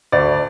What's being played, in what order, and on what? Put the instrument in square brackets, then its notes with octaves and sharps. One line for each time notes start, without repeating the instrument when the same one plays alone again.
[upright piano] D2 D5